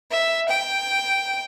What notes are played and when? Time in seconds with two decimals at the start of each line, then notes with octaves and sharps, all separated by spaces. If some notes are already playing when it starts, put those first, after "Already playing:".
0.11 E5
0.50 G5